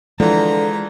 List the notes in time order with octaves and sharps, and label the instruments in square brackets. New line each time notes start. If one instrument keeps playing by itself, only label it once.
[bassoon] D3 [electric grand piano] E3 F3 [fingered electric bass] G#3 [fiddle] A#5